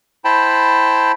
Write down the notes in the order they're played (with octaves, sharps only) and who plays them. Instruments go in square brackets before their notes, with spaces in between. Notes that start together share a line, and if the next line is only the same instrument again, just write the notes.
[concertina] E4 C5 G5 A5 B5